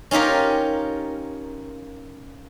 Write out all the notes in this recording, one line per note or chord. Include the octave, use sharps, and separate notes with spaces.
C#4 D#4 F4 G4 A#4